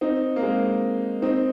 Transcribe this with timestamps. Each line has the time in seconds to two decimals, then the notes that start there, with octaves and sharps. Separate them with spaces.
0.01 C4 D#4
0.36 A#3
0.42 G#3 C4
1.22 C4 D#4